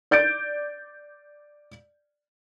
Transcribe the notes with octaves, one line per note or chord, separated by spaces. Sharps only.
D5 G6 A6 D7